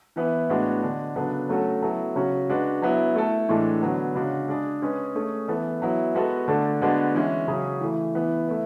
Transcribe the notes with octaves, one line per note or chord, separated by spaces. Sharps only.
E3 B3 E4 B4
A2 G#3 B3 D4 F#4
D3 G#3 D4
C#3 F#3 B3 D4 A4
F#3 A3 C#4 F#4 A4
F#3 B3 E4 A4
C#3 F#3 C#4 F#4
G#3 D4 F#4 B4
F#3 B3 E4
A3 E4 A4
A2 E3 G#3 D4 A4
D3 F#3 B3
C#3 G#3 D4 F#4
G#3 D4 G#4
G#3 C#4 G#4 B4
A3 C#4 G#4
E3 B3 E4 A4
F#3 B3 E4
G#3 B3 F#4 A4
D3 A3 D4 A4
D3 G#3 B3 D4 F#4
E3 G#3 C#4 E4
C#3 F#3 C#4 G#4
E3 A3 E4
E3 B3 E4
A3 E4 B4